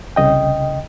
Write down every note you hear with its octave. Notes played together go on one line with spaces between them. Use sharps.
C2 C#3 D#5 G5